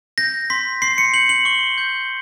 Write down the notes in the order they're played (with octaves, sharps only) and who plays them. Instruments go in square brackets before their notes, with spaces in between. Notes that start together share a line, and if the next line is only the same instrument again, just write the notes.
[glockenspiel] G6 A#6
C6 B6
C6 C7
C#7
G6 F#7
F#7
C#6 G7
G6